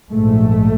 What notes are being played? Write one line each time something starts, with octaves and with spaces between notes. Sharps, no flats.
A#1 G#2 A3